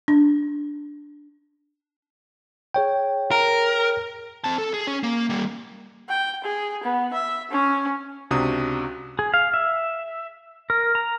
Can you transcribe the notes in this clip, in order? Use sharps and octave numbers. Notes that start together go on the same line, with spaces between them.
D4
G#4 C#5 G5
A#4
C4 A5
A4
G#4
C#4
A#3
G3 A#3
G5
G#4
B3
E5
C#4
C#2 C3 D4 F#4 A#5 D#6
G#4
F5
E5
A#4
A#5